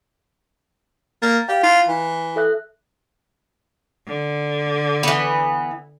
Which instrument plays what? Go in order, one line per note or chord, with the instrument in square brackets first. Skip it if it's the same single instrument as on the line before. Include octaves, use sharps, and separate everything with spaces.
[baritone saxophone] A#3 [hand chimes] A6
[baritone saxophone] G4 [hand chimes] F5
[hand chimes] E4 [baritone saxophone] F4
[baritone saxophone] E3
[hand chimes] A4 E5 F#6
[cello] D3
[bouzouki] E3 B3